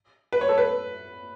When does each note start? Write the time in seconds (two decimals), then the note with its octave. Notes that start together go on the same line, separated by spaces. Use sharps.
0.32 B4
0.41 C#5
0.49 A4
0.58 B4